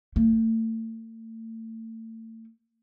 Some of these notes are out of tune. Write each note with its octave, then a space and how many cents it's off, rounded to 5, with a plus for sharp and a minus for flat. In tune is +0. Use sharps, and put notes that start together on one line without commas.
A3 +35